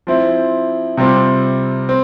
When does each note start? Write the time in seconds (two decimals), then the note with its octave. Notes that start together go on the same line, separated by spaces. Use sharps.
0.07 F3 C4 E4
0.97 C3 G3 C4 F4
1.89 C4